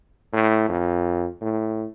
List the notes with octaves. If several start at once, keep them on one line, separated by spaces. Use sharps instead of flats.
A2
F2
A2